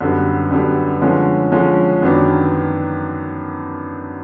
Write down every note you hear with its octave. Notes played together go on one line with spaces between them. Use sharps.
F#2 D3 G3 B3
F#2 D3 G3 B3
D3 F3 G#3 C#4
D3 F3 G#3 C#4
F#2 D#3 F#3 B3 D4